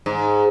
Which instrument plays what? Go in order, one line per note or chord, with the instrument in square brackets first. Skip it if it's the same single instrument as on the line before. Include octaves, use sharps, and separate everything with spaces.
[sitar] G#2